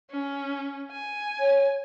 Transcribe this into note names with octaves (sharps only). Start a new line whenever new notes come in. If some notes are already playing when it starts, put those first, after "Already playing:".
C#4
G#5
C#5